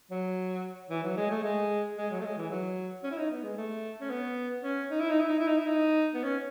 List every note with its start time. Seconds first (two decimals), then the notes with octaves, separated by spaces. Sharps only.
0.11 F#3
0.90 E3
1.03 F#3
1.17 G#3
1.30 A3
1.44 G#3
1.98 G#3
2.11 F#3
2.20 A3
2.24 G#3
2.38 E3
2.51 F#3
3.03 C#4
3.11 E4
3.17 D#4
3.31 B3
3.43 G#3
3.57 A3
4.01 C#4
4.10 B3
4.63 C#4
4.90 D#4
5.00 E4
5.10 D#4
5.20 E4
5.28 D#4
5.39 E4
5.47 D#4
5.57 E4
5.67 D#4
6.14 B3
6.24 C#4